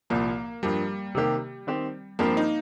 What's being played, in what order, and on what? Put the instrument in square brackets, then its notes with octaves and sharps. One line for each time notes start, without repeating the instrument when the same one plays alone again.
[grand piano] C2 A#2 F3 [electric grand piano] A#3
[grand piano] G2 F3 A#3 [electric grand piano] G3
[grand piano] C3 D#3 A#3 G4
D#3 C4 G4
[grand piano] G2 F3 C4 G4 A#4 [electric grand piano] A#3
[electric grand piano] D#4